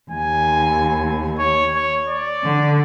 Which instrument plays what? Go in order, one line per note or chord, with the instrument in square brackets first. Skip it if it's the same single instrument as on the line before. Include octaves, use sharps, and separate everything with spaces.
[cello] D#2 [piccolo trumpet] G#5
[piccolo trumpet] C#5
C#5
D5
[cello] D3